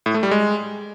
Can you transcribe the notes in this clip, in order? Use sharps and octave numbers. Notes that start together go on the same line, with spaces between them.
A2
A3
G3
G#3